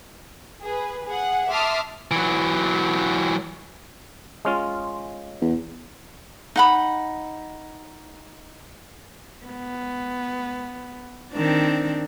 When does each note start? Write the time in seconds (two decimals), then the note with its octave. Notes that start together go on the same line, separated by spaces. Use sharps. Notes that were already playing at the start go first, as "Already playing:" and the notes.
0.63 G#4 B4
1.07 G#4 F#5
1.51 E5 A5 C6 D6 D#6 F6
2.11 E3 F#3
4.45 G#3 C#4 F4
5.41 E2
6.56 D#4 F#5 B5
9.46 B3
11.32 D#3 C4 D4